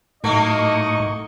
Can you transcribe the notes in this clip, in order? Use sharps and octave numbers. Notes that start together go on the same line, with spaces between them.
A2 F#3 A3 A#3 D#4 D#5 C#6